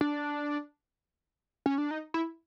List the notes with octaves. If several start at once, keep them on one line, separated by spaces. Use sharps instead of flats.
D4
C#4
D4
D#4
E4